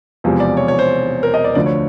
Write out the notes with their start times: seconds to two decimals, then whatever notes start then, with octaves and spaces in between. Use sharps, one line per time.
0.24 E1 E2 C3 F3
0.40 D5
0.57 C#5
0.68 C#5
0.79 C5
1.23 A#4
1.34 D#5
1.44 D5
1.55 D2 D3 F3 D5
1.66 C#5